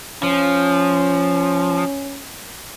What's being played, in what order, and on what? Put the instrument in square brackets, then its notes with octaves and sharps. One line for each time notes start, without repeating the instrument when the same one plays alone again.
[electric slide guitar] F3 [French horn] C#4